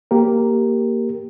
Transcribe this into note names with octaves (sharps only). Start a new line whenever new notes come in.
A#3 G4 A#4